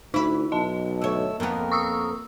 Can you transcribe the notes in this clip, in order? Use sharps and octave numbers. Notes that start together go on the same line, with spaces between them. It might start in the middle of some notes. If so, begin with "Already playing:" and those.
D2 D#4 E4 B4
B1 D#5 A5
D2 A3 C#5 E6
F2 A#3 B3 A#4
C#6 D#6 E6